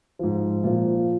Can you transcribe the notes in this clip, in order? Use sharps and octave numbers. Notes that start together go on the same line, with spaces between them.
G#2 F3
A#2 F3